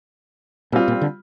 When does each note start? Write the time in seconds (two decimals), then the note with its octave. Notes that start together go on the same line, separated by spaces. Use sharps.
0.72 A#2 G3 C4 F4
0.88 A#2
1.01 D3